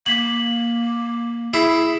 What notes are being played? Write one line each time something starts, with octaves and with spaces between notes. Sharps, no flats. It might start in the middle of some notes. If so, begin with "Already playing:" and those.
A#3 B6 F#7
E4 G#4